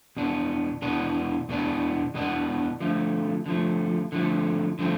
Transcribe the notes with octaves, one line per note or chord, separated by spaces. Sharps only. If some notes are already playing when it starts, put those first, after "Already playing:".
E2 B2 B3 D4
E2 B2 B3 D4
E2 B2 B3 D4
E2 B2 B3 D4
D3 F3 A3
D3 F3 A3
D3 F3 A3
D3 F3 A3